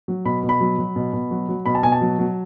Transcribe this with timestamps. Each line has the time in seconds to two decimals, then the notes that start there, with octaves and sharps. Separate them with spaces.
0.08 F#3
0.25 B2 B5
0.43 B2
0.49 B5
0.61 F#3
0.78 F#3
0.96 B2
1.13 B2
1.31 F#3
1.48 F#3
1.66 B2 B5
1.75 A5
1.83 B2 G#5
1.92 A5
2.01 F#3
2.19 F#3